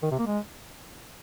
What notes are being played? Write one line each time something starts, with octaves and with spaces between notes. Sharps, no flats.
D#3
C3
A#3
G#3